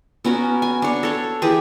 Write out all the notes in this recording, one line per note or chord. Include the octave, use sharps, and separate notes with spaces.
B3 C#4 F#4 A#4
G#5
D4 C#5
A4 C#5
E3 G4 G#4